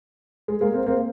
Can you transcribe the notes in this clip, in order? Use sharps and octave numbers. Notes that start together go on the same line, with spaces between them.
G#3
G#3 A#3
A#3 C4
A#3 C4